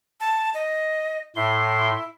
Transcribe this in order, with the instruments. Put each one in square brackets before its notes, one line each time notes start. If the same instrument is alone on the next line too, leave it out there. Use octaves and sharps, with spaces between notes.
[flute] A5
D#5
[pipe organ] A2 C6 [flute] E4